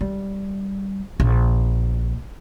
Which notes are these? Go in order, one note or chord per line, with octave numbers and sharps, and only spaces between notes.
G3
A#1